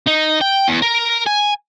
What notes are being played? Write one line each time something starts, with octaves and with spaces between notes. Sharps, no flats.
D#4
G5
E2
A#4
G#5